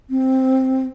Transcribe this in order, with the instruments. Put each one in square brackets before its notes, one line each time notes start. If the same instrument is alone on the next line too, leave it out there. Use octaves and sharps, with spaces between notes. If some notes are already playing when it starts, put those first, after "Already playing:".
[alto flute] C4